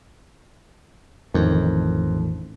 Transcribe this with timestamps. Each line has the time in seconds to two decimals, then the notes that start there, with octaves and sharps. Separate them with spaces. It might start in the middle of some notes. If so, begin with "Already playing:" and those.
1.34 A1 F2 D#3